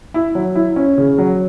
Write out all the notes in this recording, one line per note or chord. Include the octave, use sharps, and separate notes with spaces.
E4
F#3
E4
C#4
C#3
F#3